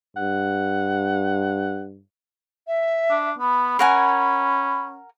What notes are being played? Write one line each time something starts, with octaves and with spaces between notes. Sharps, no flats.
G2 F#5
E5
D4
B3 B5
C#4 A#4 F#5 G#5